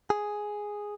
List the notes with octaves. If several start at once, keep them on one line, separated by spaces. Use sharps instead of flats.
G#4